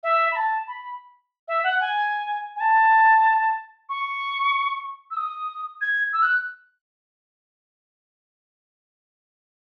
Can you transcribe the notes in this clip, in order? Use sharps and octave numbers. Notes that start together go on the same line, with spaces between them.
E5
B5
A5
B5
E5
F#5
G#5
G#5
A5
C#6
E6
D#6
G#6
E6
F#6